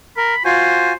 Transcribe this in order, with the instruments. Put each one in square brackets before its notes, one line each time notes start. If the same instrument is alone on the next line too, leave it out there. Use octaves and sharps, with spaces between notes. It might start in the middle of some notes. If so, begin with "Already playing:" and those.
[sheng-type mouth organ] A#4 [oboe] B5
[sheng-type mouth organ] F4 F#4 G#5 [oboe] C5